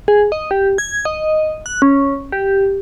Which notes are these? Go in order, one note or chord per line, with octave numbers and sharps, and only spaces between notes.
G#4
D#5
G4
G#6
D#5
F#6
C#4
G4